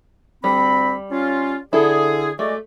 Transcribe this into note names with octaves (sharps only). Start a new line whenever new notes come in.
D2 G3 C4 B5
C#4 F4
D3 E4 G#4 A4
G#3 A3 F#4 D5